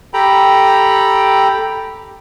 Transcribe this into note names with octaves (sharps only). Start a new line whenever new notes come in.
G4 A4 G5 A#5 B5